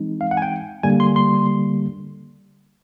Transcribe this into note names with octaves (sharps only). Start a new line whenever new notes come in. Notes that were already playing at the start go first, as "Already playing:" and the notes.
Already playing: E3 G#3 C4 D#4
F5
F#5
G#5
G5
D3 G3 A#3 G#5
C6
C6